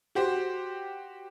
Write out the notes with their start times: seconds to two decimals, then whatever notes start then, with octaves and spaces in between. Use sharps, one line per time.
0.15 F#4 G4 C5